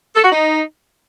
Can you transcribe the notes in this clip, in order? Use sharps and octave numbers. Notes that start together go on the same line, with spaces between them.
A4
F#4
D#4